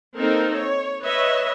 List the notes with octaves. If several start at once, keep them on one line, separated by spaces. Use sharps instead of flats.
A#3 C4 D#4 A4 A#4
C#5
B4 C#5 D#5 E5